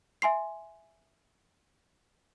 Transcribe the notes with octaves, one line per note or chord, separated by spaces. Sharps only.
E5 G#5 C6 C7